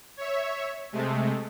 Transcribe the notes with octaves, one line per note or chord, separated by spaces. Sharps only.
C#5 E5
C3 G#3 A3